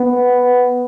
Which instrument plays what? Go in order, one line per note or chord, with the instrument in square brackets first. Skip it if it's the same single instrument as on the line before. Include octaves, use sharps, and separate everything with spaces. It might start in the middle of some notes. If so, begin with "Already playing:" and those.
Already playing: [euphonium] B3